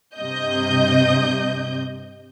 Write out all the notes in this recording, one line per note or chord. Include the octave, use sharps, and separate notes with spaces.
G2 C3 D#5 G6